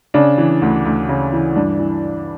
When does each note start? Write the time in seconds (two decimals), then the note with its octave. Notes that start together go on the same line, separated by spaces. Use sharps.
0.14 C#3 D4
0.38 E3
0.62 D2
0.85 D2
1.09 C#3
1.33 E3
1.56 G2 D4
1.79 E3